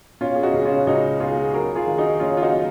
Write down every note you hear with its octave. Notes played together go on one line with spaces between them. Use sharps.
B2 C#4 F4
G#4
D#4 F#4
C#2
C#4 F4
C#2 D#4 F#4
B2 F4 G#4
F#3 F#4 A#4
F4 G#4
D#3
D#4 F#4
F#1 C#4 F4
F4
D#4 F#4
F#3